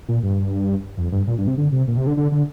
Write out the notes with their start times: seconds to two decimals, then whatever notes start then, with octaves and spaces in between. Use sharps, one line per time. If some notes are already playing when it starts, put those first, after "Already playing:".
0.08 A#2
0.23 G2
0.97 F2
1.12 G2
1.27 A#2
1.38 G2
1.47 C3
1.58 D3
1.72 C3
1.88 A#2
1.97 C3
2.07 D3
2.17 D3
2.32 D3